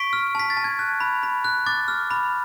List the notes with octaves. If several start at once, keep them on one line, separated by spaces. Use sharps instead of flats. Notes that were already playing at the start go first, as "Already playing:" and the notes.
Already playing: C#6 B6 D7
F6
A5 B6
A6
A5
G#6
F#6
B5
B5
F#6
D6 A6
F6
B5